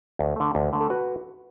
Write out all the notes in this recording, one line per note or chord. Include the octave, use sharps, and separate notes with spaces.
D2
D3 A3
D2
D3 A3
A4
F#4 B4